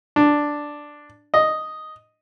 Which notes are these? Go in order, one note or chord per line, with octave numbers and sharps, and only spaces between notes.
D4
D#5